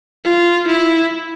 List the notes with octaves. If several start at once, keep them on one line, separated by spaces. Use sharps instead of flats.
F4
E4